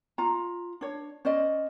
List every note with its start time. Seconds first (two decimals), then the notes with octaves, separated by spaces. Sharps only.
0.18 F4 A#5
0.81 D4 C#5
1.25 C#4 C5 D5 D#5